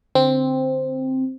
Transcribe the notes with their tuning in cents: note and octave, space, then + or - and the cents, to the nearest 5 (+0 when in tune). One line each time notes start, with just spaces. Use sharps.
D3 -5 C4 +0